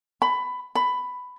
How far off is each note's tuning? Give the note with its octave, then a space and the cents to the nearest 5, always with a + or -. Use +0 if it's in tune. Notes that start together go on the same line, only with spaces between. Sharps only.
B5 +15
B5 +10